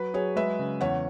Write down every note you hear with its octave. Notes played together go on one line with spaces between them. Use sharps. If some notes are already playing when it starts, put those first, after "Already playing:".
Already playing: F#3 B4
F#3 G#4 C#5
G#3 B4 E5
C#3
E2 C#5 F#5